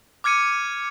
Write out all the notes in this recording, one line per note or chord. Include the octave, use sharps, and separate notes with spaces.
D6 F6 G#6 C#7 D#7